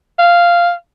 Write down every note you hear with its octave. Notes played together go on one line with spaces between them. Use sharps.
F5